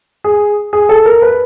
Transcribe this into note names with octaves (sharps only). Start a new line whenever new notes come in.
G#4
G#4
A4
A#4
B4